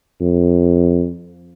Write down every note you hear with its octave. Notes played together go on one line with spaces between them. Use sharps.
F2